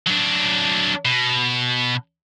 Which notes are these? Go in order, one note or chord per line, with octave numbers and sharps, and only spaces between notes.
F#3 D4
B2